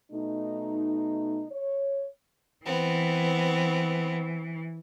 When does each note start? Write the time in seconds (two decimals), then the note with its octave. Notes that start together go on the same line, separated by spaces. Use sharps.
0.12 B2 A3 D#4
1.52 C#5
2.66 E3 B3 C4